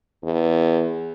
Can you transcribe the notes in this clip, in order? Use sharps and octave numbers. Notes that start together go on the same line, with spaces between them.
E2